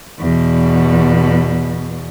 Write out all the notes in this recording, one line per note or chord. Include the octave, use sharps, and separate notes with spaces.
E2 B2